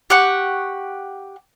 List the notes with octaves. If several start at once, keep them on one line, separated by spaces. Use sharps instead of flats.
G4 F#5 C#6